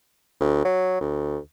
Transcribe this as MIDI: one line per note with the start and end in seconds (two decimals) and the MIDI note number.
0.40 0.61 38
0.65 0.99 54
1.01 1.38 38